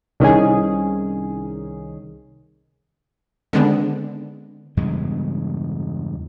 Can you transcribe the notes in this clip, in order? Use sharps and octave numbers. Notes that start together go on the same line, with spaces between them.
C2 D#3 C#4 G#4
D3 D#3 G#3 B3 C4 D4
E2 G2 C#3 G#3